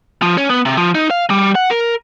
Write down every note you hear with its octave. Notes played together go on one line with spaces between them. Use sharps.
F3
C#4
B3
C3
F3
D#4
F5
G3
F#5
A#4